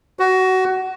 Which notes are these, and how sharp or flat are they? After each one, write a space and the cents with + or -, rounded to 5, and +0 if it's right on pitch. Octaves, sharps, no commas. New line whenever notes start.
F#4 +20